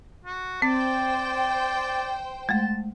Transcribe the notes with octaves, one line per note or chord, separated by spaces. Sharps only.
F#4
C4 C5 D5 G5
G#3 A3 A5